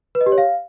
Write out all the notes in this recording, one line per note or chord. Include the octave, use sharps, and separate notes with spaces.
B4
D#5
G4
C#5
F5